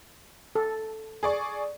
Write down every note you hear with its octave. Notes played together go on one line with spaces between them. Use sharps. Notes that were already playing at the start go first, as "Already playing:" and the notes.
A4
G#4 D5 C#6